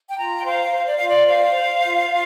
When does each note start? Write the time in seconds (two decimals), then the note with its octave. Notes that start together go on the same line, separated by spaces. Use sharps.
0.10 G5
0.17 F4 A#5
0.37 G5
0.45 C5 F5
0.72 C5
0.86 D5
0.97 F4 F5
1.07 D5
1.27 C5 F5
1.55 C5
1.82 F4
2.10 F4